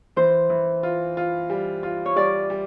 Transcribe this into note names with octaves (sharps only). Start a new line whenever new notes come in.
E3 C5
E3
F4
F4
G3
F4
C#5
G3 D5
G3